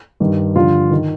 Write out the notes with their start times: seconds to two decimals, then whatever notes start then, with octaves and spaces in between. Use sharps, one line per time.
0.20 G2 D#3
0.55 G2 D3 F3 F4
0.91 D#3